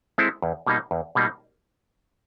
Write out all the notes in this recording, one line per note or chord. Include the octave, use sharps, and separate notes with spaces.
G#3 C4 E4 A4
E2
B2 G3 A#3 D#4
E2
B2 G3 A#3 D#4